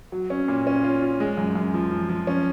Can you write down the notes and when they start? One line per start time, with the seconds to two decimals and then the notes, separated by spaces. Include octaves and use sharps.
0.12 F#3
0.30 C#4
0.48 A#2
0.67 C#4
0.84 F4
1.02 F4
1.20 G#3
1.38 F#2
1.55 F#2
1.74 F3
1.91 F3
2.09 F3
2.27 C#4